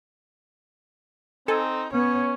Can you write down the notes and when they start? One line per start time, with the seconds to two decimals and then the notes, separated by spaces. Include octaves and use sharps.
1.48 C4 D#4 A4 G#5
1.93 B3 C#4 C#5